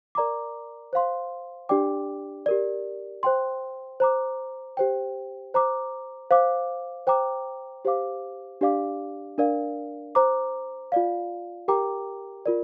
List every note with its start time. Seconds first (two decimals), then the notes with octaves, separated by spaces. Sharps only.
0.15 A#4 D5 A#5 D6
0.93 C5 F5 C6
1.69 D4 G4 D5 G5 D6
2.46 G4 A#4 D5
3.23 C5 G5 C6
4.00 C5 A#5 D6
4.77 G4 C5 G5
5.54 C5 A#5 D6
6.31 C5 F5 D6
7.07 C5 G5 A#5 D6
7.85 G4 C5 F5 D6
8.61 D4 G4 D5 F5 D6
9.38 D4 A#4 D5 F5
10.15 C5 A#5 D6
10.92 F4 D5 F5
11.68 G4 A#4 G5 A#5 D6
12.46 F4 A#4 D5